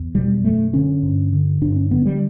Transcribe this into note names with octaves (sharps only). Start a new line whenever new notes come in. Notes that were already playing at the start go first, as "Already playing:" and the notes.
Already playing: E2
B2 G3
F#2 A3
D3 C#4
G2
D3
G2 D4
C#4
D3 B3
G3